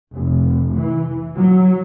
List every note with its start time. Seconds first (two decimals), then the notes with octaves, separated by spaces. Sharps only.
0.13 F1
0.74 E3
1.36 F#3